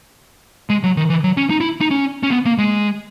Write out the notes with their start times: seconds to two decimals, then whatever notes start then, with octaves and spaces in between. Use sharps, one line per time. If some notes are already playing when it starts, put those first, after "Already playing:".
0.70 G#3
0.83 F#3
0.97 D#3
1.10 E3
1.24 F#3
1.37 C#4
1.50 D#4
1.61 E4
1.81 D#4
1.91 C#4
2.23 C#4
2.31 B3
2.45 A#3
2.58 G#3